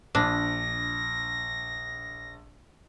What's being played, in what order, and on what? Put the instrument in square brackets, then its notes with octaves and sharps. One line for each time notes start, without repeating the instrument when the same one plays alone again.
[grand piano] A#1 [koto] D4 [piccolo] A#6